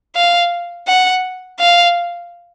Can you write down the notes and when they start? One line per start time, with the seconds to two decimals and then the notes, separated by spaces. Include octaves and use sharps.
0.16 F5
0.88 F#5
1.60 F5